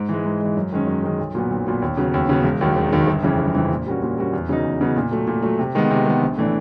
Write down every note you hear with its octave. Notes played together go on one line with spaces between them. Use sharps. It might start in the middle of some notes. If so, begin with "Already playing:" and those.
Already playing: G#2
E3 G#3
G#2
E3 G#3
F#2
D#3 G#3 C#4
F#2
D#3 G#3 C#4
B1
A#2 F#3 B3
B1
A#2 F#3 B3
D#2
C#3 F#3 B3
D#2
C#3 F#3 B3
E1
D#2 D#3 F#3
E1
D#2 D#3 F#3
G1
F2 C#3 E3
G1
F2 C#3 E3
A#2
G3 A#3 C#4 F#4
A#2
G3 A#3 C#4 F#4
E2
C#3 F#3 B3 D#4
E2
C#3 F#3 B3 D#4
A#2
F#3 A3
A#2
F#3 A3
C3
D#3 G#3 B3
C3
D#3 G#3 B3
A#1
A2 E3 A3 D4